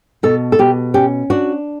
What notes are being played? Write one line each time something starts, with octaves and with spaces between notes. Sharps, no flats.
B2 A4
A4
B2 G4
C#4 G4
D4 F#4